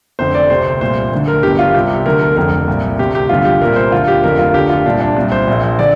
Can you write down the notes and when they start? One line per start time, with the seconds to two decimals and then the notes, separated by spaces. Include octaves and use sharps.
0.19 F1 F2 D3 C5
0.34 D5
0.50 D2 C3 C5
0.66 C5
0.81 C2 A#2 C5
1.12 D2 D3
1.28 A#4
1.43 G1 G2 D3 G4
1.59 F4
1.74 C2 C3 G4
2.06 D2 D3 A#4
2.21 A#4
2.37 F1 F2 D3 A#4
2.68 C2 A#2
2.99 D2 C3 G4
3.15 G4
3.29 G1 G2 D3 F4
3.45 G4
3.61 C2 A#2 A#4
3.76 C5
3.92 D2 D3 F4
4.08 G4
4.23 F1 F2 D3 A#4
4.39 F4
4.54 D2 D3 G4
4.69 F4
4.86 C2 A#2 D4
5.01 D4
5.16 C2 A#2
5.32 C5
5.48 A#1 A#2
5.79 D3 D5